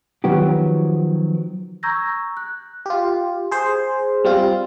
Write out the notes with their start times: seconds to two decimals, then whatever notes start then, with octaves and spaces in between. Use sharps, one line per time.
0.24 D#3 F3 F#3 B3 F#4 G4
1.83 A#5 C#6 E6 G6 G#6 A#6
2.37 F#6
2.86 F4 G4
3.51 G#4 C5
4.24 G3 C4 F4